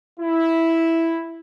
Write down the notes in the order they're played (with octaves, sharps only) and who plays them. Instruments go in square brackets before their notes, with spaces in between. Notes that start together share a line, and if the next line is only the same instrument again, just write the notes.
[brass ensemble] E4